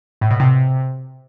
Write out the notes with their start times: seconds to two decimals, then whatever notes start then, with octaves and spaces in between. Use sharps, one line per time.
0.21 A2
0.31 B2
0.40 C3